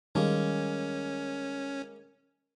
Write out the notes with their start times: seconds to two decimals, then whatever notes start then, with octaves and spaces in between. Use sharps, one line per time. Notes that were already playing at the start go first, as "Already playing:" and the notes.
0.15 D#3 G3 G#3 A#3 C#4